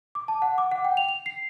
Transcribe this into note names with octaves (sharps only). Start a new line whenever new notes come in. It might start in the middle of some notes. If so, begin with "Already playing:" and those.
D6
A5
F#5
D6
F#5
G5
F7
F7
C7